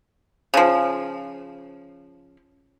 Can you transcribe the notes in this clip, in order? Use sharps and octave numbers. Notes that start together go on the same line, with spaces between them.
C#3 F3